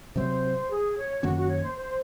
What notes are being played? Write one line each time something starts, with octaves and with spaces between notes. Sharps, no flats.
C3 F#3 C4 C5
G#4
C#5
F#2 D#3 A#3 C#4 F#4
F#4
C#5
C5
C5